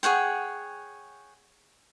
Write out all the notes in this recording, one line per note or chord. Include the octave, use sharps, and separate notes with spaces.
G#4 C#5 F#5 G5